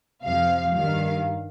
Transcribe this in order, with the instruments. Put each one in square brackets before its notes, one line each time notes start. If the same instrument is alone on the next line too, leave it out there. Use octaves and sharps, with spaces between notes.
[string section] F2 C3 F3 F5
G2 D#3 G3 F5